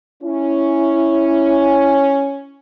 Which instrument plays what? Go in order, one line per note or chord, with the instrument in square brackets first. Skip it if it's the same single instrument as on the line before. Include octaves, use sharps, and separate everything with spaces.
[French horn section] C#4 [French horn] E4